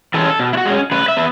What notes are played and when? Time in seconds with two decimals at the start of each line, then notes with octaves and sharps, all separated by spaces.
0.14 E3 G#3 C#4 A4
0.39 B2
0.53 E4
0.57 F#4
0.65 G#3 C#4
0.91 C#3 B4
1.08 E5
1.17 B3